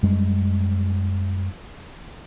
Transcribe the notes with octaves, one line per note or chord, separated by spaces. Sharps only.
F#2 G3 G#3